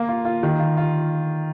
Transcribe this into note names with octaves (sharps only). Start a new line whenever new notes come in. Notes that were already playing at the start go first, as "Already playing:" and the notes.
Already playing: A#3
F4
F4
D#3
F4
F4